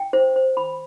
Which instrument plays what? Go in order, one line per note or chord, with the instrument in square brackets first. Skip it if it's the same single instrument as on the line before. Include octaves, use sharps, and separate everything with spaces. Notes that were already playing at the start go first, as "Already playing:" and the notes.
Already playing: [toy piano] G5
C5
C5
B5